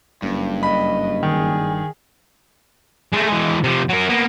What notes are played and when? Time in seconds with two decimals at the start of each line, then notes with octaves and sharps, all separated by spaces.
0.22 F#1 G2
0.63 D#5 B5
1.23 D#3 G#4
3.12 G#3 A3
3.29 E3 G#3
3.64 C3 F3
3.89 F#3 A#4
4.09 A#3 B3